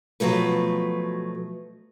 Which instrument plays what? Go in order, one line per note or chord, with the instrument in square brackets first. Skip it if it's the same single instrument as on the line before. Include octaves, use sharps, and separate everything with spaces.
[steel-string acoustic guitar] B2 F3 F#3 A3 B4